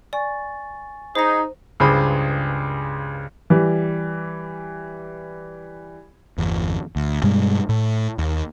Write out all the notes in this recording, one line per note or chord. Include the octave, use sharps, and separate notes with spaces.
D5 G#5 C#6 A6
D#4 G#4 C5 A#6
C#2 G2 G#4 C5 B5
E3 G3
G1 E2
D2
G2 B2 G3 G#3
A2
D#2